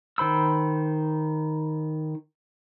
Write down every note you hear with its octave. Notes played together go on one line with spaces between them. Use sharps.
D#3 C5 B5 E6